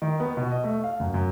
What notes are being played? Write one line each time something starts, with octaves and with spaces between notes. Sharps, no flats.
D#3
B3
B2
D#5
A3
F5
F#2
F#2